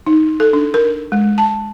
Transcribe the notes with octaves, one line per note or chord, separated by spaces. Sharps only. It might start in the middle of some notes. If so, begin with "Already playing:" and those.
D#4
A4
D4
A#4
G#3
A5